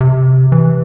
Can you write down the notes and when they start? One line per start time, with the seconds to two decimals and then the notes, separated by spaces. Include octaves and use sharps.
0.01 C3
0.52 E3